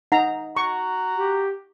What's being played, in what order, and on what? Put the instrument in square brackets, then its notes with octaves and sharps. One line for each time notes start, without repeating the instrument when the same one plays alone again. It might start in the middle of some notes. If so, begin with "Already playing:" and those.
[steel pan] D#4 A#5 [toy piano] F#5
[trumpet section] F#4 A#5 [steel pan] C#6
[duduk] G4